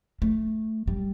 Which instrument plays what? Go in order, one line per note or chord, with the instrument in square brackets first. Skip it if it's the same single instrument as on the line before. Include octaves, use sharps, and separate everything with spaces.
[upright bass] A3
G3